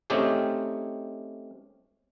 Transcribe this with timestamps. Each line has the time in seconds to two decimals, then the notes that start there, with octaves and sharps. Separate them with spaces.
0.10 A3 C4 C#4 D#4 G4 G#4